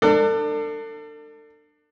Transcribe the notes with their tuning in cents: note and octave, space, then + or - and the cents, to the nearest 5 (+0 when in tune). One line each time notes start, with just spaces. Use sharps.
D4 +25 A4 +40